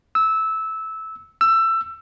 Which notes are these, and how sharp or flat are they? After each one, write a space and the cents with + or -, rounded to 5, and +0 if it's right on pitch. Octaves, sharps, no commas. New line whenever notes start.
E6 -15
E6 +20